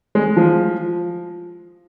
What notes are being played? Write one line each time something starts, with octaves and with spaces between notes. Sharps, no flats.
G#3
F3